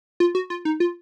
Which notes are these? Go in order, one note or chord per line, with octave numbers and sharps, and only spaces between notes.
F4
F#4
F4
D#4
F4